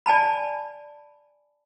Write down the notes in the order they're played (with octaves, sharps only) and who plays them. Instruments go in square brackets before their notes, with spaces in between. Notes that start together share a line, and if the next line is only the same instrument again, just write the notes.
[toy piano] D5 G#5 A5 B5